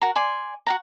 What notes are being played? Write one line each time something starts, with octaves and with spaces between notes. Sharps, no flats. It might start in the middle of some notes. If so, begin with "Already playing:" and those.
F#4 A#4 A#5
D5 G#5 C6
F#4 F#5 A#5